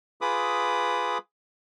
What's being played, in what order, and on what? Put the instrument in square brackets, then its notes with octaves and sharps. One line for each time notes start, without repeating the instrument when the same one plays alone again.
[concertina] F4 G#4 B4 B5 D6 D#6